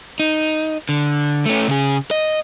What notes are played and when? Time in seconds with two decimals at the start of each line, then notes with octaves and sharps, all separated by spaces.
0.20 D#4
0.89 D3
1.46 A3 C#4
1.68 C#3 G#4
2.11 D#5